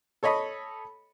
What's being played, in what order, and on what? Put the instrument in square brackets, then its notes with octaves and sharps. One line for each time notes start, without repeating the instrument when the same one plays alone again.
[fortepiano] A4 C#5 D#5 B5